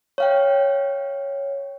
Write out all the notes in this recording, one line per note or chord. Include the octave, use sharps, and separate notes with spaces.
C#5 F5 G5